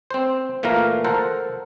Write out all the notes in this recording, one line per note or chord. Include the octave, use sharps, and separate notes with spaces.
C4 C5
A#2 E3 A3 A#3 F5 A#5
A4 A#4 C5 F#5